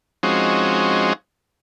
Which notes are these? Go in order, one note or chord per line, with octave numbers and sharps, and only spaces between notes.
F3 G#3 C4 C#4 D#4 F#4